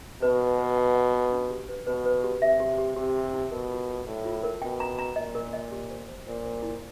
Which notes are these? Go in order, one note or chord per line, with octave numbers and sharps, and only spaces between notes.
B2 B4
B4
B4
F#5
D#5
B4
D4
G4
B4
B2 B4
B4
G4
C3 E5
G4
G4
C3 G4
G4
D#4
B2 A#4
F4
F4
A2 D5
F4
A#4
B2 G5
A#5
A#5
A#2 D#5
A#4
D#5
G4
C5
C5
A#2 C5
C5
E4